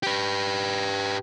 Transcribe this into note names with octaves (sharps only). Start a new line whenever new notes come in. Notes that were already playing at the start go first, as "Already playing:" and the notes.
G4 B4